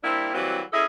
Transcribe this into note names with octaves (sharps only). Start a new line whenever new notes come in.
G3 A#3 C4 D4 E4
E3 F#3 G3 A#3 C4
C#4 E4 G#4 A4 D#5